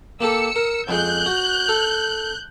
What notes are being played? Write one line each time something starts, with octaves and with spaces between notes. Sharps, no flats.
A#3 G4 A4 E6 C#7
A#4
F2 G#3 F#6 G6
F#4
A4